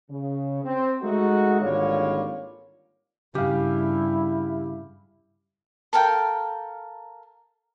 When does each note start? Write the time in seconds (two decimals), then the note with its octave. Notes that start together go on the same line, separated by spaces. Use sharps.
0.10 C#3
0.64 C4
1.02 G#3 A3 D#4 F#4
1.61 G#1 D3 G3 A#3 F4 C#5
3.35 G2 C#3 E4 G4 F5
5.93 A4 A#4 F5 G5